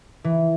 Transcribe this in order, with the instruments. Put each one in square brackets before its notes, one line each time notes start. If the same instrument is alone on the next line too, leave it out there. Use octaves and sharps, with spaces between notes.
[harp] E3